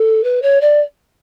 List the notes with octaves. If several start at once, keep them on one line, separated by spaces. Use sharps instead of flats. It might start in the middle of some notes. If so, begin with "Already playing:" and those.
Already playing: A4
B4
C#5
D5